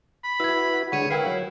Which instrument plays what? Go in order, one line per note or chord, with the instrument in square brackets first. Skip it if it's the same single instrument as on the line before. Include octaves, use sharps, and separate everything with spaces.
[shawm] B5
[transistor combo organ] E4 F#4 B4 [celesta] E6 G#6
[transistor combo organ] D3 G#3 [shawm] C#5 [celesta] F#5 D#7
[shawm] E4 [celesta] A#4 G5 C7 [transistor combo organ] B4 F5
[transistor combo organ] F#3 [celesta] C#5